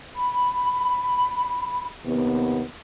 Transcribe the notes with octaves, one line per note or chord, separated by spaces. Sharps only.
B5
D#2 C3 B3